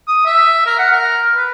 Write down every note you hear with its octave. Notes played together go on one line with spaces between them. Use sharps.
D#6
E5
A#4
F#5
A#4
B4